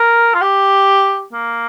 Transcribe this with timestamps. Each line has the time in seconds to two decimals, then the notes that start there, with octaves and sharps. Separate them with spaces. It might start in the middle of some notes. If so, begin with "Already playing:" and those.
Already playing: A#4
0.34 F4
0.41 G4
1.33 A#3